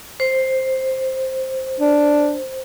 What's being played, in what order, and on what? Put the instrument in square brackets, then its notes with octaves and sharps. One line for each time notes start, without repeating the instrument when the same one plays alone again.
[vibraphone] C5
[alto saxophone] D4